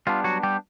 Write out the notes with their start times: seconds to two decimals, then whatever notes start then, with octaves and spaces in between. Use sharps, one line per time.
0.07 G3 B3 D4 F4
0.24 F#3 F#4
0.43 G3 G4